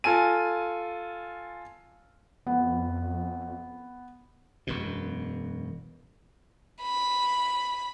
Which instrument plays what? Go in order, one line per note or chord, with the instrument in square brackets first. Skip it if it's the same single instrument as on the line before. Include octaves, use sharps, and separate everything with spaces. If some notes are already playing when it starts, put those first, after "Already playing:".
[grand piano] F4 A4 G#5 D#7
[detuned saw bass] F2 [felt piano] B3
[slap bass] E1 F#2 B2
[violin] B5